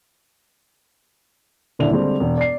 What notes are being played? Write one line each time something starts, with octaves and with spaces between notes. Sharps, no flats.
D#1 D3 E4 F7
D3 G3 G#3 C4
E1
D5 C7